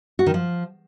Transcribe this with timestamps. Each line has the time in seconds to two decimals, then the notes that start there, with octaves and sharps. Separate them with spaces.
0.19 F#4
0.26 D#3
0.34 F3